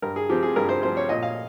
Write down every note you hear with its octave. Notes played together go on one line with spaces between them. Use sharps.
G2 A#4
G#4
F3 C4 G4
G#4
G2 A#4
C5
F3 C4 C5
C#5
A#2 D#5
F5